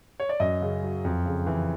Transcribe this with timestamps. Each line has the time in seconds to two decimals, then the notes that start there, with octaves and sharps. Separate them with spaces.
0.20 C#5
0.29 D5
0.40 F#2 D#5
0.62 C#3
0.83 F#3
1.05 F2
1.26 C#3
1.47 E3